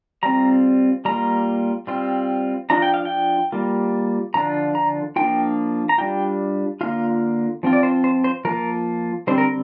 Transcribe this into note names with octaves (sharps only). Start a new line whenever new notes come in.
G3 C4 F4 A#5
G3 A#3 F4 A#5
G3 C4 F4
F3 D4 F4 A#5
G5
F5
G5
G3 A#3 F4
D3 F3 D4 F4 A#5
A#5
F3 A#3 D4 F4 G5
A#5
G3 D4 F4 G5
D3 A#3 F4 F5
F3 C4 F4
D5
C5
C5
C5
F3 A#3 F4 A#4
D3 G3 C4 C5
A#4